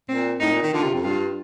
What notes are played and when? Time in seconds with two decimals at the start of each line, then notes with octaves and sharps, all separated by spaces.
0.09 A#2 C4
0.40 A2 D#4
0.51 A#2
0.62 D#3
0.73 D3 F4
0.83 C3
0.94 F2
1.04 G2 F4